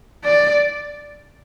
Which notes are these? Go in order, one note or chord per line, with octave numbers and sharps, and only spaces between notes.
D5